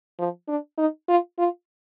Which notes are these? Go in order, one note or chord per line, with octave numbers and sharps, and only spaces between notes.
F3
D4
D#4
F4
F4